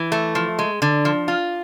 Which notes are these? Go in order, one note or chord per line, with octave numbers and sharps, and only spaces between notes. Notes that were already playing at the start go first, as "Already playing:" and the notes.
Already playing: E3
A3
F3
G#3
D3
F3
F4